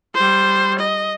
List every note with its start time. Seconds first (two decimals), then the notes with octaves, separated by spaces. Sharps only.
0.15 G3 C5
0.79 D#5